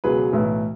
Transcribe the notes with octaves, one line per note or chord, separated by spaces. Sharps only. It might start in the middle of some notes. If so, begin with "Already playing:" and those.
C#2 B2 F#3 G#4 B4
B1 A2 E3